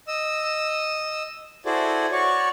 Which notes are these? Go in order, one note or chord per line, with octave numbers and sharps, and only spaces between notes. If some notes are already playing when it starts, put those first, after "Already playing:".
D#5 E6
E4 F#4 G#4 A4 C5 D5
F#4 C#5 D5 C#6